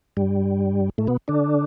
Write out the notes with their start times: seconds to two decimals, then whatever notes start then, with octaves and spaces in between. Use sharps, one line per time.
0.17 G2 G3
0.98 A2 A3
1.07 B2 B3
1.28 D3 D4